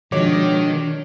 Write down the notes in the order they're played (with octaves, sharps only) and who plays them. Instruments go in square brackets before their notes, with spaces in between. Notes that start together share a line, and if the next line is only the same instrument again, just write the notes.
[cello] B2 D4 [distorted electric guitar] D#3 [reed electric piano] F3 G#3 F#4 [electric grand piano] C#5 D6